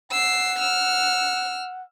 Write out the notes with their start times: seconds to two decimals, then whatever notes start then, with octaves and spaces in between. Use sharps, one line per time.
0.11 F#5 E6 C7
0.60 E6 F6